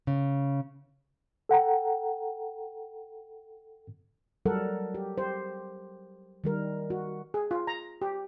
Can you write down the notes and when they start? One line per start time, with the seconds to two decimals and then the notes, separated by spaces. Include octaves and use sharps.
0.07 C#3
1.49 A4 F#5 G5 A#5
4.45 F#3 G3 A4 A#4 F#5
4.95 G4
5.18 G4 C5
6.44 D#3 G3 A#4
6.90 F#4
7.34 G#4
7.51 F4
7.67 A#5
8.02 G4